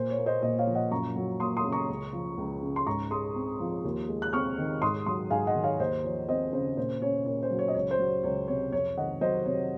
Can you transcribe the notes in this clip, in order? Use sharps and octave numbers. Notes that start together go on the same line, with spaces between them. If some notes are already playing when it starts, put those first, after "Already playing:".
Already playing: A#2 C5
C#5
A#3
C5 D#5
A#2 C5 D#5
C#5 F5
F3
D#5 F#5
F#2 A#5 C#6
F#3
A#3 C6 D#6
C6 D#6
C#3
A#5 C#6
C#2
F3
C#2
C#3
C6
G#2 A#5 C#6
G#3 C6 D#6
C4
F3
D#2
G#3
F#6
C4 C#6 F6
D#3
G#2 C6 D#6
F#3 C6 D#6
G#2 F5 G#5
D#5 F#5
D#3
C#5 F5
D#2 C5 D#5
F3 C#5
C4 C5 D#5
C#3 C5
A#2 C5
C#4 C#5
A#2 C#5
C5
F#3
C#5
D#5
C#2 C#5
C5
F#3
C#5
C#2 C#5
C3 C#5
F2 C#5
D#3 D#5 F#5
F#3 C5 D#5
C3 C#5